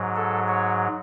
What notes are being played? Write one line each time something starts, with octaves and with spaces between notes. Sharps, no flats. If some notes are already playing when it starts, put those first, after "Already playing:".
Already playing: G#2 F#3
A4
C#5